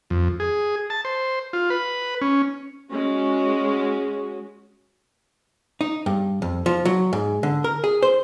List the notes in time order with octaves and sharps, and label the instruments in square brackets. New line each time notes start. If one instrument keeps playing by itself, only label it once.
[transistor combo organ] F2
G#4
A5
C5
F4
B4
C#4
[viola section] G#3 C#4 F#4
[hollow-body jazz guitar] D#4
G2
F2
F3
F#3
G#2
D3
A#4
G#4
C5